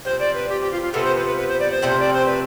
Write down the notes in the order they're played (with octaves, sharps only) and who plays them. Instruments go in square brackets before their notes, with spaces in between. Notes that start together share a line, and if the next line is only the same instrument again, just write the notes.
[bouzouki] C3 F3 C4 [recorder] C5
[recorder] D5
B4
G4
G4
F4
F4
[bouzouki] C3 F3 B3 F4 [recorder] A4
[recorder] C5
B4
B4
B4
C5
D5
C5
[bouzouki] C3 F3 A3 C4
[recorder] D5
C5
B4